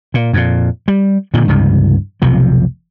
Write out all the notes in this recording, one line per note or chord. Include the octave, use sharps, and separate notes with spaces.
A#2
F2 A#2
G3
A#2 D3 D#3 F3
C#2 G2 C3 E3
F1 B1 C3 F3